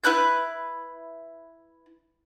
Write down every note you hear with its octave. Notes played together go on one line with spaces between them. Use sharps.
E4 B4 F#6 G6